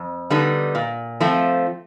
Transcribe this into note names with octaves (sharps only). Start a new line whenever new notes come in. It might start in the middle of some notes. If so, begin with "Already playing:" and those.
Already playing: F2
D3 G3 B3 D#4
A#2
F3 A3 C4 F4